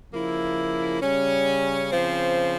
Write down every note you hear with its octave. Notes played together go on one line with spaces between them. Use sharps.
C#3 F3 A#3 E4
C#3 G3 C#4
C#3 F3 C4